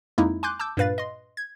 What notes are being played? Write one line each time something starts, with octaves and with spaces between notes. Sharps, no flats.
F2 G#3 A#3 D#4 E4
G#5 C6 D6 F#6 G6
A5 D6 E6 G6
G2 A#2 B4 F5 A6
D#5 C6
G#6